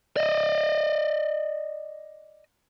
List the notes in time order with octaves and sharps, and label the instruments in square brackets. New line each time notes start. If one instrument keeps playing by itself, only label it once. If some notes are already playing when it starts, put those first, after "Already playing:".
[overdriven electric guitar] D5 D#5